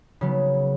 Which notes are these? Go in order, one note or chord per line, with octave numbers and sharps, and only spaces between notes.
C#3 F#3 B3